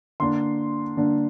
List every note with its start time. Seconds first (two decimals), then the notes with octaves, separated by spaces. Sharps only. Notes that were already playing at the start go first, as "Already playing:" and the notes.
0.20 D3 A#3 D4 C6
0.97 D3 A#3 D4